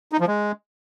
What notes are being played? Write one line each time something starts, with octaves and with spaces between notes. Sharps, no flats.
D#4
F3
G#3